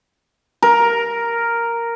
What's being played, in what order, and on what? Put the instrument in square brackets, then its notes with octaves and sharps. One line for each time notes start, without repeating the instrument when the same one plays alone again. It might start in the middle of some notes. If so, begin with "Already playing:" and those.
[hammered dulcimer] A#4